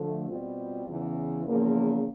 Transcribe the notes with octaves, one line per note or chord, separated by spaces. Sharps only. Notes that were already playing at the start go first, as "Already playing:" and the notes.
Already playing: D3 F3 A3
B2 G3 C4 F4
E2 C#3 E3
E2 C#3 F3 A#3